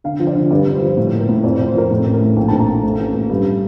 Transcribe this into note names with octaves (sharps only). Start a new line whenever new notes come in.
D3 F5
F3
D5
D3
G2 D5
G2
C5
F3
A2
A#3
A#4
A2
F2 D5
D5
F2
C5
F3 A#4
A2 A4
A1
A#4
A3
A#1 G5
A5
A#1
A#5
A#1
A3
A1
A1
G2